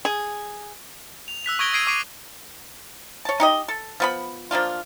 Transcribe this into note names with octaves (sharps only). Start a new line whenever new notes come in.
G#4
F7
E6 F#6 B6 F7
C#6 D#6 G#6 A#6 D7 G7
D#6 G#6 C7 D7 D#7 G7
C#6 D6 E6 C7 D7 D#7
C#5 A5
D#4 G4 D#5
A4
F3 B3 B5
F3 A#3 D4 F4